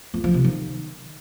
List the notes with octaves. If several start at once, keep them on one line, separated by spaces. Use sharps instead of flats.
F2
F3
C3
D#3